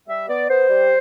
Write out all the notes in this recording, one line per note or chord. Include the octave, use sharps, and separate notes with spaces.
G3 E5
B3 D5
B3 C5
G3